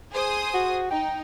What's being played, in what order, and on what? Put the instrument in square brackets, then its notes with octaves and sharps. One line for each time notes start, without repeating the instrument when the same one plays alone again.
[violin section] G#4 C5 D#6
[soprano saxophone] F#4
[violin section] D#4 [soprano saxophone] G5